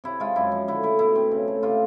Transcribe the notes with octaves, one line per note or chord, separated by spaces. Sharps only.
C3 E4
G#3 F4
F#2 E4
F3
D3 E4
A3 E4
B2 E4
C4
C#3
A3
C3 F4